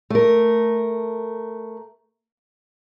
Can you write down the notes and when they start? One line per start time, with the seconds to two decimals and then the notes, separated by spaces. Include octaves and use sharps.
0.10 A3 A#4